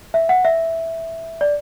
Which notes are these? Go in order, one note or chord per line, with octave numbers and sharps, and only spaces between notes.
E5
F#5
E5
D5